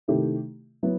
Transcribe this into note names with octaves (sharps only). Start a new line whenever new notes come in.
C3 D#3 A3 E4 G4
F#3 B3 E4